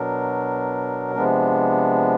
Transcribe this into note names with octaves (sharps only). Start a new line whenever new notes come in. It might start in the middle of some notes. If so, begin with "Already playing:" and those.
Already playing: B2 F#3 B3 D4 A#4
C3 F3 G#3 B3 D4